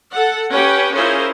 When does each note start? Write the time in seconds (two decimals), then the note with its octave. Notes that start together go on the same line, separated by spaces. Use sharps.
0.12 A4 F#5
0.51 C#4 G4 B4 F#5 G5
0.94 C#4 E4 F4 G#4 A#4 C5